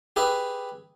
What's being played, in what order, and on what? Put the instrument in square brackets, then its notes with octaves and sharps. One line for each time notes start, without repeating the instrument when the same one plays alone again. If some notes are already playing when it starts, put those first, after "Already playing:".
[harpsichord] G4 G#4 B4 E5